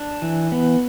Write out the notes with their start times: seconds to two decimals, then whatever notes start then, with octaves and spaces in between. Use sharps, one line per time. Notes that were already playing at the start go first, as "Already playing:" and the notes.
Already playing: D4
0.22 E3
0.52 B3